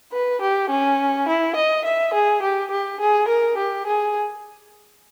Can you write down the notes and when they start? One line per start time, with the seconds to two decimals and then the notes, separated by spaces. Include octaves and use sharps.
0.13 B4
0.41 G4
0.70 C#4
1.28 E4
1.56 D#5
1.85 E5
2.14 G#4
2.43 G4
2.71 G4
3.00 G#4
3.28 A#4
3.58 G4
3.87 G#4